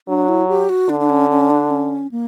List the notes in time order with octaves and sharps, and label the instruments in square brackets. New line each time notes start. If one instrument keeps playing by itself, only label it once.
[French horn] F#3 [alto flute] D4
[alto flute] E4
G4
F#4
[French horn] D3 [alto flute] D4
[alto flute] D4
C#4
C#4
D4
C#4
A#3